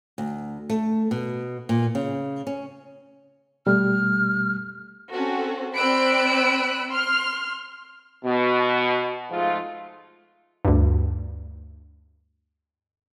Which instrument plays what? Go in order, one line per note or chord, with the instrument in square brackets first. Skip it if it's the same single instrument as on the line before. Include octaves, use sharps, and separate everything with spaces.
[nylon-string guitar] D2
A3
B2
A#2
C#3
C#4
[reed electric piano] B2 G3 A3 [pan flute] F6
[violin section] C4 C#4 F#4 A4
C4 D5 B5 E6 F#6 D7
C6 F6
[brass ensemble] B2
G#2 F3 G#3 A3 F4
[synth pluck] D2 G2